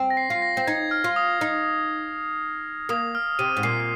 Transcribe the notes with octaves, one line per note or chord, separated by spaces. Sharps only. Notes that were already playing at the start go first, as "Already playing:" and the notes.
Already playing: C4
A#6
C7
F4 C7
A#6
C4
D#4 G#6
F6
F4
D#6
D#4
A#3 D#6
F6
C3 D#7
G#2
A#2 C7
C7